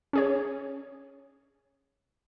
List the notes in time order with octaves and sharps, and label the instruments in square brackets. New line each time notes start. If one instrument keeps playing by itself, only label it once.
[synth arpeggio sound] C#4 G#4 C#5